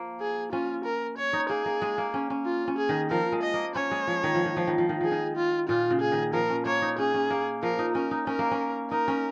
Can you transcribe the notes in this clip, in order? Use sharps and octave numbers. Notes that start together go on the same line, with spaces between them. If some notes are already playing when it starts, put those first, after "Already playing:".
Already playing: F3 A#3
G#4
C#4 F4
A#4
C#5
D#4
A#3 G#4
A#3
G#3
A#3
C#4
C#4
F4
C#4
G#4
D#3
F3 A#4
G#3
D#5
A#3
C#4 C#5
G#3
F3
D#3
F3
D#3
F3
D#3
F3
D#3
F3 G#4
D#3
F4
A#2 F4
C#3
G#4
D#3
F3 A#4
C#4
A#3 C#5
D#4
C#4 G#4
C#4
A#3
F3 A#4
D#4
C#4 A#4
D#4
C#4 A#4
A#3
C#4
D#4 A#4
C#4